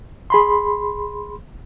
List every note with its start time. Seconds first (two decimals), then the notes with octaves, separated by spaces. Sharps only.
0.30 G#4 B5 C6